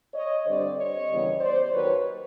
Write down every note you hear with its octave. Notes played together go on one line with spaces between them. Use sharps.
C#5 D#5
G2 D3 G3 C4 C5 D5
C#5 D#5
D#2 C#3 E3 G3 B3
C5 D5
D#2 D#3 F#3 B4 C#5